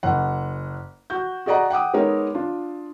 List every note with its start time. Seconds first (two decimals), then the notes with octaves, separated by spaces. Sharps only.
0.03 F#1 F#5
1.10 F#4 G6
1.46 F#4 G#4 D5 D#5 F#5 A#5
1.70 F#5 G5 D6 D#6
1.94 G#3 B3 D#4 A#4 C#5 D#5
2.35 D4 F4